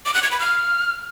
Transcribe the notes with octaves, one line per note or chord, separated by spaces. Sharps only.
D6
F#6
G#6
B5
F6